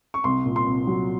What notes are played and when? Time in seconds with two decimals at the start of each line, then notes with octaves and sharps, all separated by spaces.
0.14 C#6
0.24 C2 C6
0.46 A#2
0.56 C6
0.66 C2
0.87 F#3